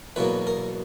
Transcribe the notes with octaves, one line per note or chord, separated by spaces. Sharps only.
E2 B2 F#3 A#3 B4
A#4